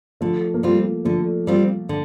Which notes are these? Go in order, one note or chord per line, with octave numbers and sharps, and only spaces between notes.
D3 F3 A3
A#3
F3 G3 A3 C4 F4
D3 F3 A3
G3 C4 F4
D3